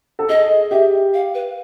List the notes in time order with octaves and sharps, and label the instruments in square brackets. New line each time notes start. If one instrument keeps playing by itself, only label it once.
[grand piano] A4
[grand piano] G#4 [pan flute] D#5
[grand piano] G4 [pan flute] E5
[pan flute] F5
B4